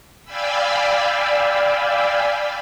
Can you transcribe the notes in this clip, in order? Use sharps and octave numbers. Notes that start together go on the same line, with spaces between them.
D5 F5 G5 G#5 B5 E6